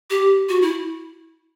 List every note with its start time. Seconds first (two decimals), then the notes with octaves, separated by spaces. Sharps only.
0.10 G4
0.49 F#4
0.62 E4